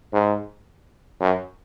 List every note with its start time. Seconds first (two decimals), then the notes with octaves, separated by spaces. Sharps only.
0.13 G#2
1.21 F#2